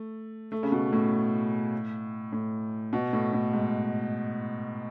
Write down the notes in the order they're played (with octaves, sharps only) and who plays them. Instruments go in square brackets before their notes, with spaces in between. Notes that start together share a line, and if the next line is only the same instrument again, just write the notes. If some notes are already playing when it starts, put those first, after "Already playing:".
Already playing: [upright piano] A3
A3
C#3
B2
A2
A2
B2
A2
A2
G#2